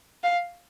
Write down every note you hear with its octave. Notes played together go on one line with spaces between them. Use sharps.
F5